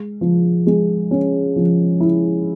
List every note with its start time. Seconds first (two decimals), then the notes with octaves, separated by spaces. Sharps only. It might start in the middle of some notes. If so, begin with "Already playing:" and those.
Already playing: G#3
0.21 F3
0.67 G#3
1.11 C#4
1.56 F3
2.00 E4